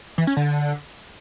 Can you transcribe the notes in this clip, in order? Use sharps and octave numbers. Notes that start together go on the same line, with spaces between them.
E3
C#4
D3